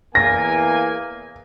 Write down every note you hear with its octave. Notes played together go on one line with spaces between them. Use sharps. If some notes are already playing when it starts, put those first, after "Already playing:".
E2 A#3 G#5 A#6